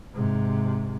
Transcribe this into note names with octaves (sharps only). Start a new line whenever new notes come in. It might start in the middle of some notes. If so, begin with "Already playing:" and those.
G#2 C3